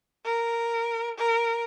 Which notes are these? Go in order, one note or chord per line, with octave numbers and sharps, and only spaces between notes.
A#4
A#4